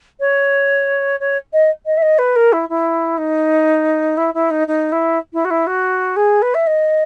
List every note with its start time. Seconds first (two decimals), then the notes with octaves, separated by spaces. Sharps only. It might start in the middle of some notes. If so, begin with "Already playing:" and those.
0.20 C#5
1.20 C#5
1.53 D#5
1.86 D#5
1.97 E5
2.02 D#5
2.18 B4
2.36 A#4
2.53 E4
2.69 E4
3.18 D#4
4.17 E4
4.34 E4
4.50 D#4
4.68 D#4
4.92 E4
5.33 E4
5.45 F#4
5.50 E4
5.67 F#4
6.16 G#4
6.42 B4
6.54 E5
6.67 D#5